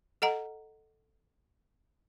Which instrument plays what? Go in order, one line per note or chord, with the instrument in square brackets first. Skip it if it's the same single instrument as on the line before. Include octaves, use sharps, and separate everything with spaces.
[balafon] A4 D#5 F#5 A#5